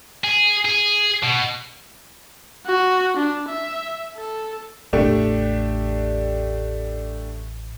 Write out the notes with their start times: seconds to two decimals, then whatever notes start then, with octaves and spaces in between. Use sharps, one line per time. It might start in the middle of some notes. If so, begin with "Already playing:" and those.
0.24 G#4
0.65 G#4
1.23 B2
2.66 F#4
3.17 D4
3.49 E5
4.16 A4
4.93 A1 E2 A3 D4 G4